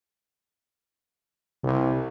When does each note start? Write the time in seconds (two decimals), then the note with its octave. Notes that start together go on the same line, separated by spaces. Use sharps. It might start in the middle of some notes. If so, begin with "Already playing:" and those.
1.63 C2 C3